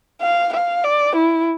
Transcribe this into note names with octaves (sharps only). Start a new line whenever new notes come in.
F5
F5
D5
E4